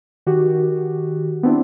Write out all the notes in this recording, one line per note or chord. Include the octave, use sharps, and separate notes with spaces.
D#3 F#4 G4
B3 C4 D4 E4